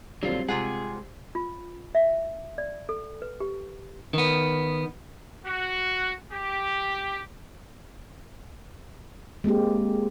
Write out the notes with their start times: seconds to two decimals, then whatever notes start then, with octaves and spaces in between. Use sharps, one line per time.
0.23 A#1 D3 F#3 G3 C4 D4 F4
0.48 C3 G#3 F4 G#4 F#5
1.35 F4
1.95 E5
2.58 D5
2.89 A4
3.22 B4
3.40 G4
4.13 D#3 B3
5.45 F#4
6.31 G4
9.44 G#3 A#3 C4 G4